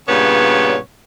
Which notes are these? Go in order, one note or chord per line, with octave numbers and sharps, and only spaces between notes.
G2 A#2 C#3 B3 C#5